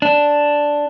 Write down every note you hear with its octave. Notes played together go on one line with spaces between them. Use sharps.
D4